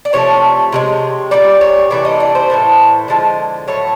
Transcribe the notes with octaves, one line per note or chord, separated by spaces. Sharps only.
D5
C3 F3 A3 C#5
C3 E3 G#3
A#2 G3 D5
C#5
C3 E3 A3 D5
D#5
D5
C5
A2 E3 A3
D3 F3 G#3
A2 F#3 A3 C#5